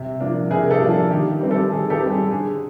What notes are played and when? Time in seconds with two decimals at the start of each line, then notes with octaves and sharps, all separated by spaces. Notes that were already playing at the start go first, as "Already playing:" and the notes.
Already playing: C3
0.20 F3 A#3 D4
0.50 C3 G#4 A#4
0.71 G4 A4
0.80 F3 A#3 D4
1.10 D#3 G4
1.41 G3 C4
1.51 G4 A4
1.70 D#3 G#4
1.90 G4 A4
2.00 G3 C4
2.10 G#4
2.31 D3 G#4